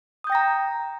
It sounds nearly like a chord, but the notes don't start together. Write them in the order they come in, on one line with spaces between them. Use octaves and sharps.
D#6 G6 G5 A#6 A#5